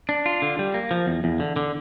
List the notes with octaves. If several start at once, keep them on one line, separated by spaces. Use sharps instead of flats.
D4
F4
D3
G3
A#3
F3
E2
E2
D3
D3